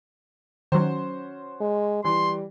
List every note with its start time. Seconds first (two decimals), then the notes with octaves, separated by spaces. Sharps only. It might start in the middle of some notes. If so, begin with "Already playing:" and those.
0.72 D#3 F#3 C#4 F#4 C5
1.60 G#3
2.04 E3 G3 C6